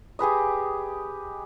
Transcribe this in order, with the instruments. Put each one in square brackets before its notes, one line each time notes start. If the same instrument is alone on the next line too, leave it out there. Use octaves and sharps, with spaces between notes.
[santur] G4 G#4 B4 D#5